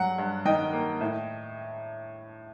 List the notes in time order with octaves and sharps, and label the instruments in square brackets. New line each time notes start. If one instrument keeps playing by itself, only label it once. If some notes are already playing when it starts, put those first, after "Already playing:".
Already playing: [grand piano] G2 F#3 F#5
G2
D#3 D#5 G5
A#3
A2